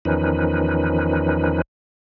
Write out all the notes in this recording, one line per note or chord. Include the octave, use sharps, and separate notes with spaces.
E2 D#3 F3 C#4 D#4 B4